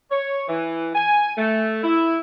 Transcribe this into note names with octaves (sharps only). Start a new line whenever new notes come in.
C#5
E3
G#5
A3
E4